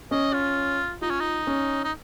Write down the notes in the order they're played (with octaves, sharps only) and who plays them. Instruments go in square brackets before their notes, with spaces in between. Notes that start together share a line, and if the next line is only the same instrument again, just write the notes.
[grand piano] C#4 [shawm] D#5
[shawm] F4
[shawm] D#4 [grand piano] F4
[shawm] C#4
D#4
[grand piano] C#4
[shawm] D#4